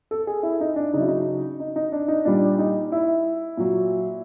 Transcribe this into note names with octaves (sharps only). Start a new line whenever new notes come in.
A4
G#4
E4
D#4
D4
C#3 F#3 D#4 E4
D#4
D#4
D#4
D4
D#4
A#2 G3 D4
D#4
E4
A#2 F#3